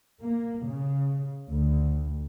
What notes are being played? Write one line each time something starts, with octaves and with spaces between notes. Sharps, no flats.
A#3
C#3
D2